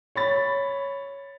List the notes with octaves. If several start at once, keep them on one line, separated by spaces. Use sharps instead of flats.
C#5 B5 A6